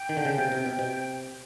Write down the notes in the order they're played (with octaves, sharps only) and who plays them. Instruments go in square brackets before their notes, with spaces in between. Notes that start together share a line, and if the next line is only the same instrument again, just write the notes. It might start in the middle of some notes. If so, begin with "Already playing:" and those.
Already playing: [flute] G5
[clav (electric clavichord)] D#3
D3
C#3
C3
C3
B2
C3